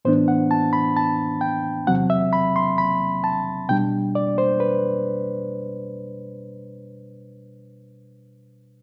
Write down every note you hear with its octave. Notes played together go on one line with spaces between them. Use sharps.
A2 E3 B3 D4 C5
F#5
A5
B5
A5
G5
E2 C3 F#3 C4 F#5
E5
B5
C6
B5
A5
B2 G3 D4 G5
D5
C5
B4